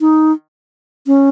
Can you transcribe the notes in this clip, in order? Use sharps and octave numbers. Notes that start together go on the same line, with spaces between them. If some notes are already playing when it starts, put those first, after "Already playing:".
D#4
C#4